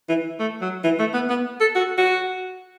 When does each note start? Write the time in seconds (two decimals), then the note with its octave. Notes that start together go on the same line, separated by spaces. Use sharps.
0.09 E3
0.39 A3
0.61 F#3
0.84 E3
0.99 A3
1.14 B3
1.30 B3
1.61 A4
1.75 F#4
1.98 F#4